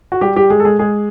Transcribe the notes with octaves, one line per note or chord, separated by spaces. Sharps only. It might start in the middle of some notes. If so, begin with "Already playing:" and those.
F#4
G3 G4
G3 G4
G#3 G#4
A4
G#3 G#4
G#3 G#4